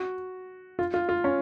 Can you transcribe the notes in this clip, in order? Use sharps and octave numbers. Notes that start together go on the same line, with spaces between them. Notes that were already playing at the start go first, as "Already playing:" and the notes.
Already playing: F#4
F4
F4
F4
C#4